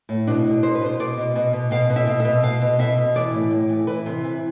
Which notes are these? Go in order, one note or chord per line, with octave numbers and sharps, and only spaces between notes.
A2
B2 D4
B2
B2 C5
B4
B2 C5
B2 D5
B2
B2
B2
B2 F5
B2
E5
B2
E5
B2
B2 F5
B2
B2 E5
B2
E3 D5
A2
A2
E3
E3 B4
C3
E3